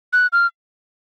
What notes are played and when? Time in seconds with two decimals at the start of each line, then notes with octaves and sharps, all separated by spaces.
0.13 F#6
0.33 F6